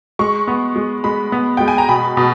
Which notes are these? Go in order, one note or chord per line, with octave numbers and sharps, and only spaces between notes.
G#3 C#6
B3
G#3
G#3 B5
B3
G#3 G5
G#5
A#5
B2 B5
B2